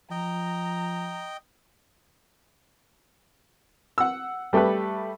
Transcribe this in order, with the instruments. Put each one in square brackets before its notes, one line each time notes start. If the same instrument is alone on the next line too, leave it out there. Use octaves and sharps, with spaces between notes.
[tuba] F3 [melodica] D#5 G5 [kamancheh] A#5
[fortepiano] F#5 E6
G3 A3 G4 A4 B4